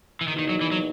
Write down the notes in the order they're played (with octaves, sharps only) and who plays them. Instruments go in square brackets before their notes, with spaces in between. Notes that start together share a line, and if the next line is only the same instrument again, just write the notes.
[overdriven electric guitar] E3
[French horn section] E2 B2 A#3 D#4 [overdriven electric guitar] D#3
[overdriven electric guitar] D#3
F#3
E3
F#3